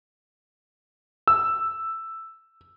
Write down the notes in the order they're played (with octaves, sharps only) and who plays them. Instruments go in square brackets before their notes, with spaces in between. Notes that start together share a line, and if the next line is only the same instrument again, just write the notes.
[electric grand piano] E6